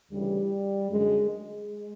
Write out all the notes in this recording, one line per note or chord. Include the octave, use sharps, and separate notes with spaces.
D2 C#3 E3 G3
F#2 D3 G#3
G#3